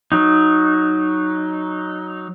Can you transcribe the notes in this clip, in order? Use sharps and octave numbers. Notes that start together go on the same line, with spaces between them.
F#3 D#4